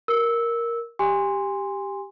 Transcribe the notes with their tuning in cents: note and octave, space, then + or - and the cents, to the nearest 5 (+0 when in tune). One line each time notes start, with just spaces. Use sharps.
A#4 +0 E6 -10
G4 +0 G#5 -25 C6 +0